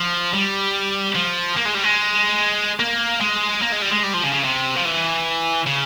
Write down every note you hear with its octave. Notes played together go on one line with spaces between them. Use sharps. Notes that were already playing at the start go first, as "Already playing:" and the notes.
Already playing: F3
G3
F3
A#3
G#3
G3
G#3
A#3
G#3
A#3
G#3
G3
G#3
G3
F3
C#3
C#3
C3
F3
E3
C#3